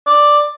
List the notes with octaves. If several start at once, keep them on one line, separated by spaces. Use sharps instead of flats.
D5